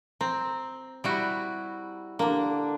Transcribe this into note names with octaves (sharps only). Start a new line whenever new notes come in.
C4 A#5
G3 E4 F#4
D3 A#3 D4